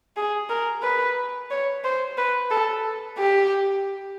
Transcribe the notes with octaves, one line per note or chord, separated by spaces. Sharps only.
G#4
A#4
B4
C#5
C5
B4
A4
G4